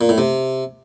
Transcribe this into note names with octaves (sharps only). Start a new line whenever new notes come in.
A#2
A2
C3